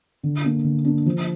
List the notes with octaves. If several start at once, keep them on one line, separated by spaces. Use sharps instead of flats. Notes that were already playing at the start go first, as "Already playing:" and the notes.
D3
A#3 D4
D3
A#3 D4
F3